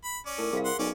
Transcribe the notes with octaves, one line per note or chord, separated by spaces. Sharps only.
B5
C#4 D5
A2 D#4 A#4
C2 G#4 A#4 F5
F#5 C6
B1 C#4 D5